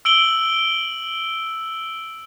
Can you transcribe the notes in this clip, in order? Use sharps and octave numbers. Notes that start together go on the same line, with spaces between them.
E6 D7 F#7 G7